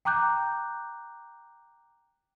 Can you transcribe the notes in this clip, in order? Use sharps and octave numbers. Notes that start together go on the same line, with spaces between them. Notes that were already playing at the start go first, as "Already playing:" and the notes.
G5 A#5 D6 F#6 G6